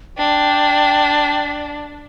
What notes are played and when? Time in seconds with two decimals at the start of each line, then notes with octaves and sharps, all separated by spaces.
0.18 D4 G5